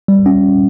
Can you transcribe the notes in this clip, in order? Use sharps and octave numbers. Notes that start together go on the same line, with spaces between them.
G3
C#4